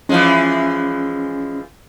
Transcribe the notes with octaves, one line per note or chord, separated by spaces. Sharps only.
E3 F3 G#3 C#4